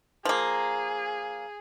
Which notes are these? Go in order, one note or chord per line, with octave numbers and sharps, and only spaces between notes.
F3 A#3 G#4